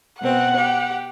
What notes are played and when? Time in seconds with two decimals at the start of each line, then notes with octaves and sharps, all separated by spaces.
0.21 B2 C4 F#5
0.56 G4